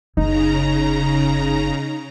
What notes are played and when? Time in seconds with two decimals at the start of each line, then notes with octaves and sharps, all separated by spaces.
0.17 F#1 C#3 D#4 A#5